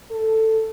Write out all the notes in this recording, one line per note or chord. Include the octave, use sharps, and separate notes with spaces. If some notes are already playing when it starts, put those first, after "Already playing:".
A4